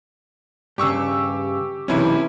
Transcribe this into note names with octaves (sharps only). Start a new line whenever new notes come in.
G2 C#3 G4 C#6 E6
B1 C3 E3 C#4 E4